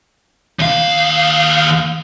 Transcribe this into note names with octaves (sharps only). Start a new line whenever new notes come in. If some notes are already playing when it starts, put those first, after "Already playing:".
D#2 F5